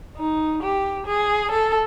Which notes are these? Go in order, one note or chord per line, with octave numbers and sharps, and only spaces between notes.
D#4
G4
G#4
A4